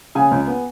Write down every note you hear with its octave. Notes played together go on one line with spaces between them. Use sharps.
C#3 G#5
C#2
B3